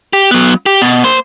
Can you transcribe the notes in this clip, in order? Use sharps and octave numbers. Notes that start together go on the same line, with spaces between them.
G4
F#3 B3
G4
B2
A#3 C5